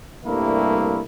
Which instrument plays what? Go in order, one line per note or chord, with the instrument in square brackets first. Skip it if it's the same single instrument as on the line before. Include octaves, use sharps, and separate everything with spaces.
[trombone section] C2 G2 A3 A#3 E4